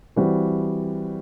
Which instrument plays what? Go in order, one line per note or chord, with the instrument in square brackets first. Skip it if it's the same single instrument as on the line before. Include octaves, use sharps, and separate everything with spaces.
[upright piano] E3 G3 C4 F#4 C5